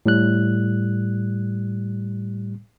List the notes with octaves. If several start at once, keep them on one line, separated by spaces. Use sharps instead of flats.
A2 G3 F#6